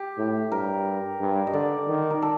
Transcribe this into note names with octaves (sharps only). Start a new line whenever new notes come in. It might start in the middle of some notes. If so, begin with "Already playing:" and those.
Already playing: G4
A2
G2 A#4
G2
D#5
D3 D5
D#3
A#4
A4